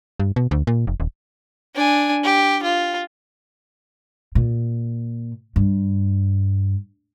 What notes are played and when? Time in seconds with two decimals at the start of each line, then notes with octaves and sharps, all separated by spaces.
0.20 G2
0.36 B2
0.51 D2
0.67 A#2
0.87 F1
1.00 D#1
1.75 D4 G#5
2.24 G4
2.63 F4
4.35 A#2
5.56 G2